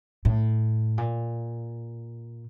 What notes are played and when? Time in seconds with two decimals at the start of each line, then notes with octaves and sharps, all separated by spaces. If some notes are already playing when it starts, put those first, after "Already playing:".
0.25 A2
0.98 A#2